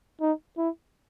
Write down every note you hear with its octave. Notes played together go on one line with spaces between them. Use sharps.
D#4
E4